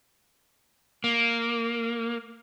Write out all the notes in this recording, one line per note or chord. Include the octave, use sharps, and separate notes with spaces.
A#3